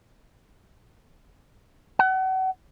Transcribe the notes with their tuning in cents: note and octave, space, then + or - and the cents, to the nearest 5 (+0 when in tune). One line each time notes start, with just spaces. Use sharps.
F#5 +35